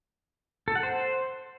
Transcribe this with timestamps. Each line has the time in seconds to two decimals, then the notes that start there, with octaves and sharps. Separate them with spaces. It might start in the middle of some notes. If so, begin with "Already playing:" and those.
0.68 A4
0.75 F#5
0.83 C5